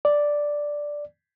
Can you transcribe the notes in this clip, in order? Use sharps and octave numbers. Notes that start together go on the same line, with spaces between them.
D5